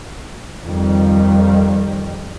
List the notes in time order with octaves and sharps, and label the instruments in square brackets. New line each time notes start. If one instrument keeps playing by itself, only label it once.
[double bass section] F2 D#3 G3